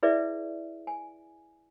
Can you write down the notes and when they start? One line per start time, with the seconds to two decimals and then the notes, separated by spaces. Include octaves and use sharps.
0.03 E4 G#4 B4 D5 E5
0.87 G#5